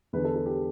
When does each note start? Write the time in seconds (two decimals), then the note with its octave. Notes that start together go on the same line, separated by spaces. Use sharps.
0.13 E2 D3 B4
0.25 A4
0.35 A4
0.46 G4